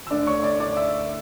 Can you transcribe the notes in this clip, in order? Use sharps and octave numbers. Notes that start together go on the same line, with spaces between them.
E6
D2 D3 A3 D4 D5 D6
C#5 C#6
D5 D6
D5 D6
E5 E6